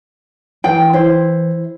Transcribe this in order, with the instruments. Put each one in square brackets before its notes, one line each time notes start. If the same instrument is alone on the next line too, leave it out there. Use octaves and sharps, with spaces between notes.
[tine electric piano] E3 [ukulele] G5
[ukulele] E4 C5